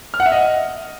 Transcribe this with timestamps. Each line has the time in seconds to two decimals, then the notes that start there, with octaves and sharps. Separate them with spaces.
0.14 F6
0.20 F#5
0.26 E5
0.32 D#5